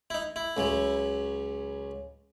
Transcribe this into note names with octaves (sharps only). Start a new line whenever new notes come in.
E4
D#4
E4
C#2 C#3 F#3